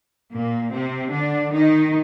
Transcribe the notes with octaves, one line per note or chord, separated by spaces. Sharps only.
A#2 A#3
C3 C4
D3 D4
D#3 D#4